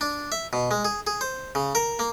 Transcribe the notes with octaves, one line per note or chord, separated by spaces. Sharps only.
D4
E5
B2
G#3
G#4
G#4
C5
C#3
A#4
A#3